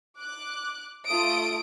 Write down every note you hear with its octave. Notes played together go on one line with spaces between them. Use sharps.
D6 F#6
A3 F4 D#6 D7